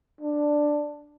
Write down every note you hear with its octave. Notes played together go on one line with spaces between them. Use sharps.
D4